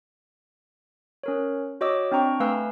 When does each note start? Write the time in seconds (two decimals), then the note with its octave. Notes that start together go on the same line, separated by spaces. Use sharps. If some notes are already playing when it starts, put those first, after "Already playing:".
1.23 C#4 A#4 C#5
1.81 F#4 C#5 D#5 D6 E6
2.12 C4 D4 G5 A#5 C#6
2.40 A3 B4 F5 G#5 E6